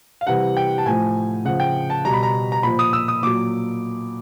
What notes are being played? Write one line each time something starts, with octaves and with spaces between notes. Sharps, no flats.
F5
C3 E3 G3 F#5
G5
A5
A2 F3 G#5
C#3 F3 F#5
G5
A5
B2 G3 A#5
B5
A#5
A#5
A#2 F3 B5
D#6
E6
D#6
A#2 F#3 D6